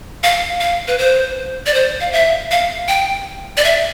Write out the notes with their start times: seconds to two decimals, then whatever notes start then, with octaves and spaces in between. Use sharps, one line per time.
0.23 F5
0.60 F5
0.88 B4
0.98 C5
1.66 D5
1.74 C5
2.01 F5
2.13 E5
2.51 F5
2.88 G5
3.57 D5
3.64 E5